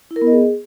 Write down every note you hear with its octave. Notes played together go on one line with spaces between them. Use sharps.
E4
A#4
B3
D#5
G#4